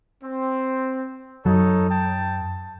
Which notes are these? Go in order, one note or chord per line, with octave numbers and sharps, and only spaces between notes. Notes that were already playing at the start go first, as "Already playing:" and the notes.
C4
F#2 F#3 D#4 A4 C#5
G5 A5